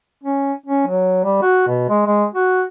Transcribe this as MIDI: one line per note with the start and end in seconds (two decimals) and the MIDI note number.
0.24 0.53 61
0.66 0.86 61
0.87 1.22 54
1.24 1.38 55
1.42 1.63 66
1.68 1.85 47
1.89 2.05 56
2.06 2.26 56
2.35 2.63 66